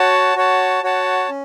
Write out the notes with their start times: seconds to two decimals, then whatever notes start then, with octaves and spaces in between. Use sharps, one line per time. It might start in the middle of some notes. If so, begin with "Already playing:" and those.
Already playing: F#4 C#5 F#5 A5
0.36 F#4 C#5 F#5 A5
0.83 F#4 C#5 F#5 A5
1.29 C#4